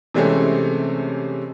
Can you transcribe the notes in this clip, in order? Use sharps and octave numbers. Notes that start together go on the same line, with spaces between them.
C3 E3 G#3 A3 C4 C#4